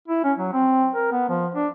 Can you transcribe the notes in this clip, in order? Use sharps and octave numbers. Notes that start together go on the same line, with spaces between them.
E4
C#4
F#3
C4
A#4
B3
F3
D4